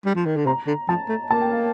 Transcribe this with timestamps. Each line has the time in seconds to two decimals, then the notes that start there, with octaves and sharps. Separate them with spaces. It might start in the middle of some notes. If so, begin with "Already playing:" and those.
0.05 G3
0.15 F3
0.26 D#3
0.36 D3
0.46 C3 A#5
0.67 D3
0.89 F3 A5
1.09 A3
1.31 A#3 A5
1.41 G5
1.51 F5